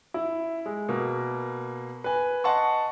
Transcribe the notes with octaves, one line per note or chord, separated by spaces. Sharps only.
E4
G#3
B2 A#3
B4 G#5
D#5 F#5 A5 C6 C#6